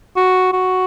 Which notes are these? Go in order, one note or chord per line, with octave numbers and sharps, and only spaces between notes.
F#4
F#4